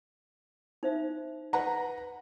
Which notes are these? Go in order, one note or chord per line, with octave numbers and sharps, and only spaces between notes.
D#4 C5 E5
B4 F#5 A#5